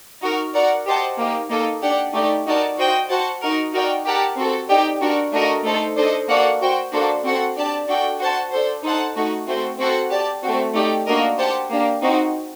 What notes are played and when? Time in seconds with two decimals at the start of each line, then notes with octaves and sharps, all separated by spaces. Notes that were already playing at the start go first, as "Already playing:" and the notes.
0.22 D#4 F#4 A#4
0.54 F#4 A#4 D5 F#5
0.86 G4 C5 D#5 F#5 A5
1.18 A#3 D#4 G4
1.50 A#3 D#4 A4 D#5
1.82 D4 G4 D5 F#5
2.13 A3 D#4 G4 D5
2.46 D#4 F#4 A#4 D5 A5
2.78 F#4 C5 D#5 G5
3.09 F#4 C5 F#5 A5
3.41 D#4 F#4 A#4
3.73 D#4 F#4 A#4 D5 G5
4.05 G4 A#4 F#5 A5
4.36 C4 F#4 A4
4.69 D#4 G4 D5 G5
5.01 D4 F#4 A#4
5.32 A3 D4 F#4 A#4 D#5
5.64 A3 D#4 A4 C5
5.96 D4 A4 C5 D#5
6.29 A#3 F#4 A4 D5 F#5
6.61 F#4 C5 G5
6.92 A#3 D4 F#4 A4 C5
7.23 C4 F#4 A4 C5 F#5
7.56 D4 G4 D5 A5
7.88 D4 F#4 A4 D5 G5
8.19 F#4 C5 F#5 A5
8.51 D4 A4 C5
8.83 D#4 A4 C5 F#5 A5
9.16 A3 D#4 F#4
9.47 A3 C4 F#4 C5
9.78 C4 F#4 A4 C5 F#5
10.11 G4 D5 A5
10.43 A3 C4 F#4
10.74 A3 D#4 G4 D5
11.07 A#3 D4 F#4 A#4 D#5
11.38 G4 C5 F#5 A5
11.70 A#3 D4 G4
12.02 C4 D#4 F#4